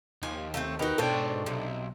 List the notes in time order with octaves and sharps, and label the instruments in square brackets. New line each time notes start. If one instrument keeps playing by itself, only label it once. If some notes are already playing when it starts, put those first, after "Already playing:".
[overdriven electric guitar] D#2 [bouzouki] F3 G#5
[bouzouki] A3 A#3 C4
[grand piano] D#4 A#4 B4 [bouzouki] F#4 G4
[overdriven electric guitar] G#2 G5 [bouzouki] B2 C5 C#5 [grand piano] D4 A4
[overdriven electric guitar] B1 [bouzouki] C3